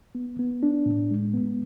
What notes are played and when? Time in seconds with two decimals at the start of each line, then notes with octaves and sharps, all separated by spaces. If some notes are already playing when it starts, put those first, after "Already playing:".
0.15 B3
0.39 B3
0.63 D4
0.86 A2
1.11 G#3
1.34 B3